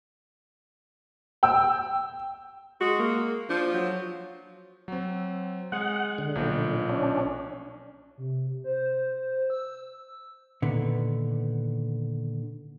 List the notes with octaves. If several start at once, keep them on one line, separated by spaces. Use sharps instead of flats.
G5 E6
G#3 F#4
A#3
F3 D4
F#3
F#3 C4
G#3 G#4 F#5
D3
B1 A#2 F3
C#4 D4
C3
C5
E6
A#2 D3 D#3 B3